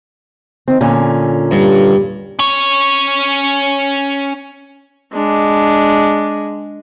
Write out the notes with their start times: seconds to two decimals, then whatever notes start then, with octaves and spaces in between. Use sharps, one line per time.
0.68 D#3 C4
0.81 A#2 D3 C#4
1.51 G2
2.39 C#4 C#5
5.13 G#3 D4